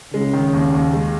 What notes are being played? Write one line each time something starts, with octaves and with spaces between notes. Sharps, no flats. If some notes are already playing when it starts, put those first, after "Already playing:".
C#3 G#3
D#3
D#2
D#2
G#3